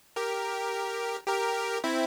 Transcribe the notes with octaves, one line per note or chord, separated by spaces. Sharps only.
G4 A#4
G4 A#4
C4 E4